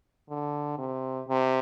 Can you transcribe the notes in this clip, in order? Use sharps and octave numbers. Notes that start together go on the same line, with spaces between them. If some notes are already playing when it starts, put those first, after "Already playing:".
D3
C3
C3